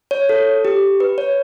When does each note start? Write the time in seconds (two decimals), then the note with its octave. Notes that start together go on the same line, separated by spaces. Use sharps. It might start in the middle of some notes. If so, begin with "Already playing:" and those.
0.11 C#5
0.29 A4
0.65 G4
1.00 B4
1.18 C#5